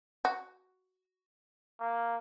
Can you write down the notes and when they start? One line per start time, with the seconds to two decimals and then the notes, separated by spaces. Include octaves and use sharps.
0.25 F#4
1.80 A#3